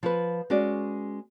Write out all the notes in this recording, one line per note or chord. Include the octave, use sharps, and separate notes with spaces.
F3 F4 B4
G#3 C#4 F#4 D5